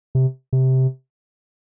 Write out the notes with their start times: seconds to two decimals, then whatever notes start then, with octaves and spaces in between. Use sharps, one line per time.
0.15 C3
0.53 C3